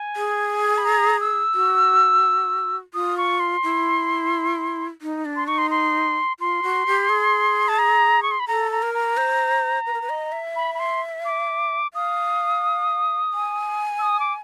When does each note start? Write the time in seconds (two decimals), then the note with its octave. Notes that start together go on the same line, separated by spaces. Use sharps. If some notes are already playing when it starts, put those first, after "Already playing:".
Already playing: G#5
0.16 G#4
0.78 B5
0.85 A#5
1.20 E6
1.55 F#4
2.94 F4 D#6
3.17 C#6
3.40 C6
3.63 E4
5.02 D#4
5.25 D4
5.36 C6
5.47 D#4 C#6
5.58 C6
5.71 C6
6.40 F4 C6
6.63 F#4
6.87 G4
7.09 G#4
7.68 A5
7.78 A#5
8.23 C#6
8.31 C6
8.40 B5
8.48 A4 A#5
8.72 A#5
8.83 A#4
8.94 A#5
9.17 C5
9.86 B4
9.94 A#4
10.02 B4
10.09 D#5
10.32 E5
10.56 B5
10.75 B5
10.79 C6
11.25 D6
11.94 F5 D#6
13.33 G#5
13.99 E6
14.02 D#6
14.20 D6